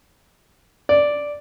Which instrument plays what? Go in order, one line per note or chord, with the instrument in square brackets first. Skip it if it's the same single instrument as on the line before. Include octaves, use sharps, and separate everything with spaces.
[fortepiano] D5